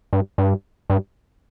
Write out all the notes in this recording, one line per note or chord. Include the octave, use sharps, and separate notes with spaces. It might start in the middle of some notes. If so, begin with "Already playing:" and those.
G2
G2
G2